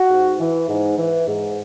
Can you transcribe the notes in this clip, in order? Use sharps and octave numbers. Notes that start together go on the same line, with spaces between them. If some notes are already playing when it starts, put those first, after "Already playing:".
Already playing: F#4
G#2
E3
G#2
E3
G#2